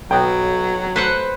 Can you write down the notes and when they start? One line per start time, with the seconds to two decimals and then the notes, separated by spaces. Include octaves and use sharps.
0.11 B1 F#3 B3 G5 A#5
0.96 A3 B4 C5 F#5